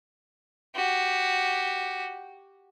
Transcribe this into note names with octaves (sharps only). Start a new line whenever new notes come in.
F#4 G4